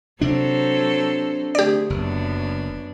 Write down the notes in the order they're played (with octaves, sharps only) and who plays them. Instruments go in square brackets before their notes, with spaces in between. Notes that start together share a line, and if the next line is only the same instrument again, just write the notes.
[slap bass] C3 D4 [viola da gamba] F#3 A4 C5
[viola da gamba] D3 A3 G#4 [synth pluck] G4 D5
[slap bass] F#1 [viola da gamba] F#2 B3 D4